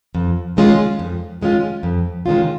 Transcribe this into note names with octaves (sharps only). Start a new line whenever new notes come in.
F2
D#3 G#3 C#4 F4
F2
D#3 G#3 C#4 F4
F2
D#3 G#3 C#4 F4